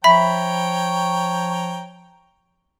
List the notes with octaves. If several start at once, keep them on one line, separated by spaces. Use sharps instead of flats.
F3 C#5 E5 G5 A#5 B5 B6